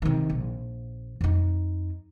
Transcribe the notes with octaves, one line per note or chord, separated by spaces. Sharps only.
C3 D#3
A#1
F2 D#4